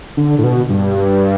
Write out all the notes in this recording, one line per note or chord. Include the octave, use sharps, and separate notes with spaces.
D3
A2
B2
G2